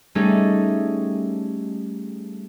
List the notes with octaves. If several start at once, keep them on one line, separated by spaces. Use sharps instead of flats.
G3 A3 C#4 D#4 G#4